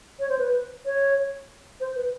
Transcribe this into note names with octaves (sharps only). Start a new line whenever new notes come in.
C#5
C5
B4
C#5
C5
B4